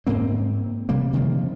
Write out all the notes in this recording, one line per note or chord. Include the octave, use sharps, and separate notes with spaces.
G#2 A#3 C4
C3 G3 A#3
C3 D#3 F3 A#3